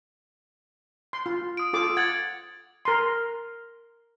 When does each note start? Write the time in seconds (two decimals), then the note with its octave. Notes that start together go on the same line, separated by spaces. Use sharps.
1.13 C6
1.26 F4
1.57 D#6 D7
1.73 F4 A4 D6
1.97 F#5 G#6 A6 F#7
2.85 A#4 C6